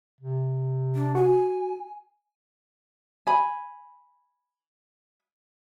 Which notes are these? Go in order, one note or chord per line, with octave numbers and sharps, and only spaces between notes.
C3
D4
F#4 G#5
G#5 B5